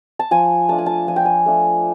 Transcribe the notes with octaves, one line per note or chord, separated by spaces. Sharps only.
A5
F3 G#5
A3 D4 F4 A5
G#5
A5
F3 G#5
G5
G#5
A3 D4 F4